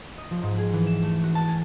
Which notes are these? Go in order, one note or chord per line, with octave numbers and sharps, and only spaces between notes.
D#5
F3
G#2
G#4
E3
E7
A3
F#4
A5
G#5